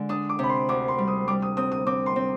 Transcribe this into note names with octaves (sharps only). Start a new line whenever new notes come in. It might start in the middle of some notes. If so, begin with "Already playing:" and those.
Already playing: D3 G#3
D4 D#6
D6
C3 B5
C6
D2 D6
C6
G3
D#6
G3 D6
D#6
C4 D#6
D#6
C4 D6
C6
C4